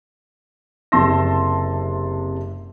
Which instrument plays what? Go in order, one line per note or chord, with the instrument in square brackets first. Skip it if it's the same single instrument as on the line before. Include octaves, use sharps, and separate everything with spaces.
[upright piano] F#1 C3 A5 C6 E6 A#6